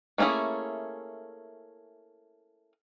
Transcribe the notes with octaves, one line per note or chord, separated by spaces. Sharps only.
A3 A#3 C#4 E4 G#4